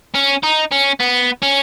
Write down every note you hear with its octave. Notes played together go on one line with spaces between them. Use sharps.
C#4
D#4
C#4
B3
C#4